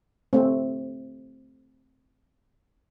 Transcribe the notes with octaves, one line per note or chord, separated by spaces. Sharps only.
A3 C4